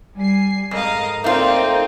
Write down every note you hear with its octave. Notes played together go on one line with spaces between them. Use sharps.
G3 G#5 C7
F2 G#2 A#4 D#5 F5
A3 A#3 C4 D#4 F4 D5